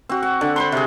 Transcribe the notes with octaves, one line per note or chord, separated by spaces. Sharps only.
C4 F#4
F#5
D3
C5 B5 C6
C3 G#4